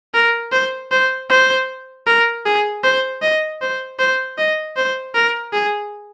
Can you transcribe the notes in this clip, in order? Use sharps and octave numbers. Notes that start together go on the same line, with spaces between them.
A#4
C5
C5
C5
A#4
G#4
C5
D#5
C5
C5
D#5
C5
A#4
G#4